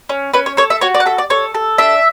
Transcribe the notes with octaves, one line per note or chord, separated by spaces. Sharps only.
C#4
C#4 B4
C#5
A4 C#5
E5
F#4 C#5
D5
F#5
A4 E5
D5
A4 C#5
A4
D4 E5